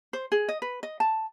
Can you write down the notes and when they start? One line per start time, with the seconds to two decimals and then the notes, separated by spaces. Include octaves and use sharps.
0.13 C5
0.32 G#4
0.49 D#5
0.62 B4
0.83 D#5
1.00 A5